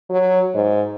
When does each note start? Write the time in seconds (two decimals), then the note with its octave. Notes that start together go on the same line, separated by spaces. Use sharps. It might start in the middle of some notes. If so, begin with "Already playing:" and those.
0.10 F#3
0.55 G#2